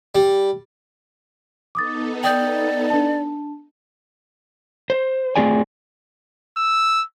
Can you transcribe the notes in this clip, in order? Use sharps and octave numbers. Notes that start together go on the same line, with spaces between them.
G3
B3 D#4 A4 D6 D#6 A6
D5 G5 D#6 G6
D4 A5
C5
A3 C4 F4 G#4 D5 G#5
E6